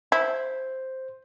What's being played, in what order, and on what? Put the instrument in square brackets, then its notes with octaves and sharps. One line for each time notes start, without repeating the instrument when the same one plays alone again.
[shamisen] E4 [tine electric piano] C5